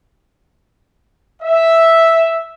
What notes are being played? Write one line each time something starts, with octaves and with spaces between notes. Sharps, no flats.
E5